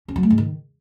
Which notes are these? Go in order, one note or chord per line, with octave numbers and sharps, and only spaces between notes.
C#4
F#3
A3
G#2
D#3